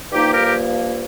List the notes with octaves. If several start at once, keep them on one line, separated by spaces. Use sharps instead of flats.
G2 F3 A#3 D#4 G4
G4 A#4
G4